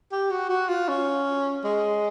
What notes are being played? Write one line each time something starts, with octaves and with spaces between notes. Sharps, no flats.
G4
F#4
F#4
F4
C#4
G#3